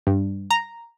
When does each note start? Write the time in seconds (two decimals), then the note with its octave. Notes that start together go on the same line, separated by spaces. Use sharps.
0.07 G2
0.51 A#5